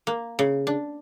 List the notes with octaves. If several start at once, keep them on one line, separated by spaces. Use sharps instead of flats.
A#3
C#3
D4